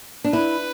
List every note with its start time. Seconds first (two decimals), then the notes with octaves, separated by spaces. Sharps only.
0.24 D4
0.32 E4 B4